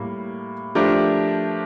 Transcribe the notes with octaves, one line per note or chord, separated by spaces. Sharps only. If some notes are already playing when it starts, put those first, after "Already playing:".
Already playing: A2 G3 A#3
F3 A3 D4 G4 A#4